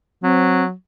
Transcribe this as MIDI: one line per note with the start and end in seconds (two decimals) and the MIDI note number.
0.23 0.73 54
0.23 0.64 60